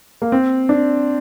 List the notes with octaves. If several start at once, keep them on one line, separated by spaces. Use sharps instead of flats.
A#3
C4
D4